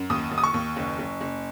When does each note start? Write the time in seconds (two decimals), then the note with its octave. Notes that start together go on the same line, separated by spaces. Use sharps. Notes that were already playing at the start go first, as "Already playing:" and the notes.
Already playing: F#2
0.10 D#2 D#6
0.31 D#2
0.38 D#6
0.44 C#6
0.54 D#2
0.76 F#1
0.98 F#1
1.21 F#1